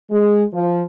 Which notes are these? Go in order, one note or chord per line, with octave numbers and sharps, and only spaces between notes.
G#3
F3